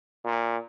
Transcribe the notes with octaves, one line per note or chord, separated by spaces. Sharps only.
A#2